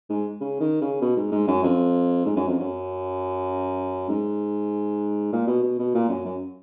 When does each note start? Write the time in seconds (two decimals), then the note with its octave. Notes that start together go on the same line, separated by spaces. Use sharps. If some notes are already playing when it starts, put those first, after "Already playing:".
0.10 G#2
0.41 C#3
0.61 D#3
0.82 C#3
1.01 B2
1.17 G#2
1.32 G#2
1.47 F#2
1.63 F2
2.26 G#2
2.36 F#2
2.48 F2
2.60 F#2
4.09 G#2
5.33 A#2
5.47 B2
5.63 B2
5.79 B2
5.95 A#2
6.09 F#2
6.26 F#2